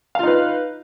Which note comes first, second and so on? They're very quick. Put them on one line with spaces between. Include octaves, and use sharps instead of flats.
F5 F4 D#4 B4